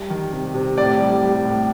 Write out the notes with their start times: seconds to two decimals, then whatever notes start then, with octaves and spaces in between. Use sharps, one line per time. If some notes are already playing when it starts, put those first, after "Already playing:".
Already playing: G3
0.10 D#3
0.33 C3
0.54 C3
0.77 A2 D5
0.99 G3
1.22 G3
1.45 A2